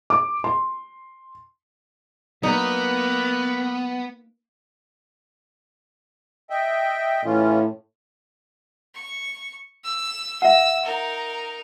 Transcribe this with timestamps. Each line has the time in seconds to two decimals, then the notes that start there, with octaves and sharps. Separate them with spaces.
0.10 D6
0.44 C6
2.43 F#3 A#3 B3 D#4 B4
6.50 D#5 E5 G5
7.25 A2 E3 C#4 F4
8.95 C#6
9.84 E6
10.42 E5 F#5 E6
10.85 D#4 A#4